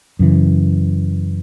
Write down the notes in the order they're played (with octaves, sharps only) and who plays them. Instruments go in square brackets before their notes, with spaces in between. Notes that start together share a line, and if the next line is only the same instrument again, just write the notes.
[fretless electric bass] F#2 C#3 E3